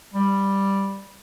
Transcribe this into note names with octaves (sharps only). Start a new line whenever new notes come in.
G3